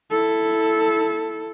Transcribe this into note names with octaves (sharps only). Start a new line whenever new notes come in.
E4 A4